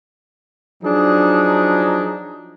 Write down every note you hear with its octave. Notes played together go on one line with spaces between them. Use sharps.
F3 F#3 D4 D#4 G#4